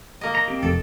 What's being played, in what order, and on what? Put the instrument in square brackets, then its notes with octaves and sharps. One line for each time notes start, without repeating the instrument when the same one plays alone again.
[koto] A#3 D#5
[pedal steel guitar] A#5
C4 G4
[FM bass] F1 [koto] A4